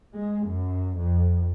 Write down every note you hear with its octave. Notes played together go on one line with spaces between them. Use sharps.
G#3
F#2
F2